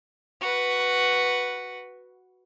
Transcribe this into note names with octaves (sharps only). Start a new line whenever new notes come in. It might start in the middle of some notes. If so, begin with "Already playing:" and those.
F#4 B4